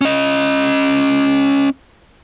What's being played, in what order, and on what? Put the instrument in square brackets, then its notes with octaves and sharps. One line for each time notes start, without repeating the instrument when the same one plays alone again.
[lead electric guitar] C#4 D#5